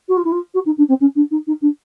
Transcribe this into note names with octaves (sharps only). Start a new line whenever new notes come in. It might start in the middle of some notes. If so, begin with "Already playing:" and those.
F#4
F4
E4
F4
F#4
D#4
D4
C4
C#4
D4
D#4
D#4
D4